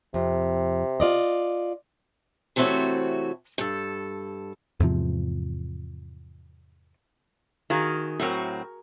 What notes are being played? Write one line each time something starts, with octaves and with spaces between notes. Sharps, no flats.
F2 C3
F4 D5 D#5
C3 E3 A3 C4 F#4 C#5
G2 A4
E2 G#2 C3 F3
D#3 F#4 G#4 F5
A2 F#3 C4 A#4 C#6